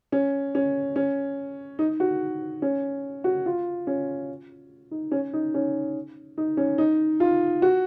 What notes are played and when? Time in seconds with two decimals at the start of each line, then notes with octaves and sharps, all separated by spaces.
0.12 C#4
0.55 C#4
0.96 C#4
1.79 D#4
2.00 F#4
2.62 C#4
3.24 F#4
3.46 F4
3.87 C#4
4.91 D#4
5.12 C#4
5.33 D#4
5.54 C#4
6.38 D#4
6.57 C#4
6.78 D#4
7.20 F4
7.62 F#4